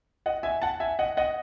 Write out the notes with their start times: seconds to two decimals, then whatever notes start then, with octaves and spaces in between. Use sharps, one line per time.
0.26 D#5 F#5
0.43 E5 G#5
0.62 F#5 A5
0.80 E5 G#5
0.99 D#5 F#5
1.17 D#5 F#5